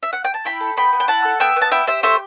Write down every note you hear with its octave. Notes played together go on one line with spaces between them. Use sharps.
E5
F#5
G5
A5
E4 G5 B5
A4
B3 G5 B5
B3
G5
E4 F#5 A5
A4
B3 E5 G5
B3
A5
E4 E5 G5
G4 C5 E5
A3 C5 E5